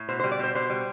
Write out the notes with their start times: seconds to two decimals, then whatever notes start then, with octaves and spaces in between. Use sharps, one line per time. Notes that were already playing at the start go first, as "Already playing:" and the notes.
Already playing: A2
0.09 B2 C5
0.20 C5
0.24 G3
0.31 D5
0.39 B2 C5
0.55 B2 C5
0.70 G3